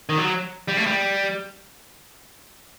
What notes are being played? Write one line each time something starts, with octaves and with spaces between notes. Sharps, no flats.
D#3
F#3
G3
A3
G3